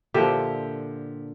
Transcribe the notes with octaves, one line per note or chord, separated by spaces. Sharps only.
A#2 D3 F3 G4 E5